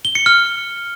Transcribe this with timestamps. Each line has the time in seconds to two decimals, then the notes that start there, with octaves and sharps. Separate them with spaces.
0.05 G7
0.15 C#7
0.26 F6